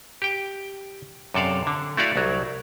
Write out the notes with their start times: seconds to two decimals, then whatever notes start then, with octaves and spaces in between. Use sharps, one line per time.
0.22 G4 G5
1.34 F#2 C3 A4 D5 F5
1.67 D3
1.97 A3 E4 F#4 D5 F5
2.16 C2 F#3